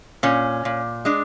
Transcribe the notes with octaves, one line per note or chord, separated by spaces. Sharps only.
A#2 C#4
A#2
G#3 D4